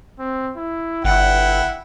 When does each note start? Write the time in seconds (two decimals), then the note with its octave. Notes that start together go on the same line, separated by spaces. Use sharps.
0.19 C4
0.56 E4
1.05 G1 E4 F#5 G5